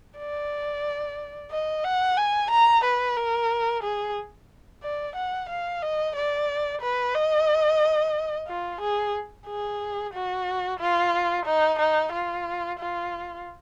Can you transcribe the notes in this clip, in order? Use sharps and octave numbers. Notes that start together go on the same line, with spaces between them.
D5
D#5
F#5
G#5
A#5
B4
A#4
G#4
D5
F#5
F5
D#5
D5
B4
D#5
F4
G#4
G#4
F#4
F4
D#4
D#4
F4
F4